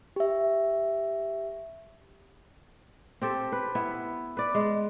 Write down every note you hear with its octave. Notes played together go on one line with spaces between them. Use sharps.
G4 E5
C4 G4 A4
B4
B3 E4
B4 D5
G#3